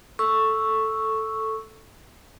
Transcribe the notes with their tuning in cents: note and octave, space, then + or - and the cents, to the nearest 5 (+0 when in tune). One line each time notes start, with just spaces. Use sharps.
A4 +0 C#6 +0 E6 +0